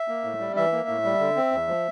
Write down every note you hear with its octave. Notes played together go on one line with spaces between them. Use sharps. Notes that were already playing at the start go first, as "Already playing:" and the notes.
Already playing: E5
A#3
A2
G3
E3 E5
A#3
A2
G3
D3
C4
E2
F3